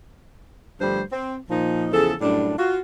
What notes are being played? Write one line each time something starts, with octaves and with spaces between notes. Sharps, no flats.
G2 D3 F3 G3 A3 C5
C4
A#2 F3 D#4
E2 C#3 F3 G#4 A4
F#2 A2 G3 D4
F4 F#4